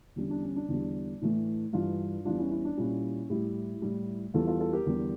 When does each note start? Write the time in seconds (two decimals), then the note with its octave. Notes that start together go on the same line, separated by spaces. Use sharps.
0.16 E2 D3 G3 C#4
0.30 D4
0.43 C#4
0.56 D4
0.69 E2 D3 G3
1.21 A2 E3 A3
1.73 G2 E3 G3 D4 F4
2.25 E2 E3 G3 D4 F4
2.38 C#4 E4
2.51 C#4 E4
2.65 D4
2.77 A#2 G3 C#4 E4
3.30 A2 G3 E4 G4
3.82 A2 G3
4.34 E2 E3 G3 F4 A4
4.47 F4 A4
4.60 F4 A4
4.73 G4 A#4
4.86 E2 D3 G3